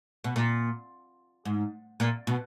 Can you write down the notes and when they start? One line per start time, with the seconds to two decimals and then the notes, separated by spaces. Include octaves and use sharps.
0.24 B2
0.36 A#2
1.45 G#2
2.00 A#2
2.27 B2